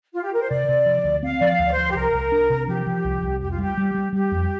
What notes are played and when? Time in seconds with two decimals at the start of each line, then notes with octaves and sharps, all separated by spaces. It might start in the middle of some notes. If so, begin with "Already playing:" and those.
0.13 F4
0.22 G4
0.32 A#4
0.41 C5
0.50 C3 D5
0.69 C3
0.86 F3
1.04 D2
1.23 C4 F5
1.38 F3 D5
1.47 F5
1.59 D2
1.65 D5
1.71 C5
1.77 F3
1.90 G4
1.95 C2 A#4
2.13 C2
2.32 D4
2.50 C3
2.68 F3 G4
2.86 F3
3.04 C2
3.23 C2
3.40 F2 G4
3.51 F4
3.58 G3 G4
3.78 G3
3.95 G3
4.13 G3 G4
4.32 F2